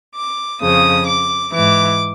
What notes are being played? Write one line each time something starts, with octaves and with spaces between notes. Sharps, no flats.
D6
F2 C#3 F3 D#6
D6
G#2 E3 D6